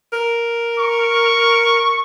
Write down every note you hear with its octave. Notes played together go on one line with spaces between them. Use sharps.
A#4
C#6